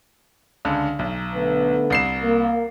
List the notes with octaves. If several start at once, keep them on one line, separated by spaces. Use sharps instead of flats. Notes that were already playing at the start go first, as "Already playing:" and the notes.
C#2 D3
B1
D3 A3 B3
C2 C7 E7
A#3